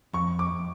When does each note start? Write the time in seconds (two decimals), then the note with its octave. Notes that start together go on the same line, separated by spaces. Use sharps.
0.13 F2 C#6
0.39 D6